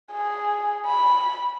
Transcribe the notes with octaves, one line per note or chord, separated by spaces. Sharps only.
G#4
B5